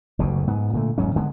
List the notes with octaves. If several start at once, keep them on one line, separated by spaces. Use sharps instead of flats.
F#1 D2 B2
G#2 B3
A#2 D3 A3
D#1 G#2 F#3 C#4
D3 G#3 B3